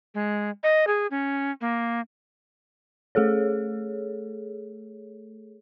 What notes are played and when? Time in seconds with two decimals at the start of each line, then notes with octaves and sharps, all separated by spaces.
0.14 G#3
0.63 D#5
0.87 G#4
1.11 C#4
1.61 A#3
3.15 A3 G#4 A4 C#5